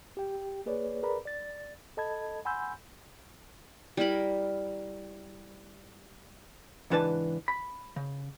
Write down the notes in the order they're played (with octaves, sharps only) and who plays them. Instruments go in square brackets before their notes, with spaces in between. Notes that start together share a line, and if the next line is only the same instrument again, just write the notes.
[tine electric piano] G4 G5
A#3 G#4 B4 C#5 D5
G#4 A#4 B4 D5 A#5 B5
D5 A6
A4 D#5 A5 B5 G#6
F#5 G#5 B5 C6 E6 G6
[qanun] G3 E4 A#4 B5
[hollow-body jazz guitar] C#2 G#2 E3 D4 B4 A5
B5
C#3